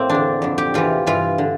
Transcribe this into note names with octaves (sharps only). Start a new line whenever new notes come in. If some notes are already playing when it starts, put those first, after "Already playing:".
Already playing: A2 A#3 C4
E2 D3 D4
F2 D3
G4
E2 C3 E3 F4
G2 E3 F4
D3